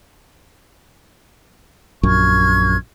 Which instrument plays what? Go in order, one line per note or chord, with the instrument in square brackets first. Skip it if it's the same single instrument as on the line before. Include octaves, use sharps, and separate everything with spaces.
[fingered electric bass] A#1 F#2 [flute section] C#6 F6 G#6